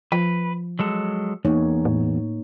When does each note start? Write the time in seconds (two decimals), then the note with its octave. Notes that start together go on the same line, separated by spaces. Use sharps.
0.12 F3 B4
0.79 F#3 G#3 A4
1.45 E2 A#3 D#4 C#5
1.85 A2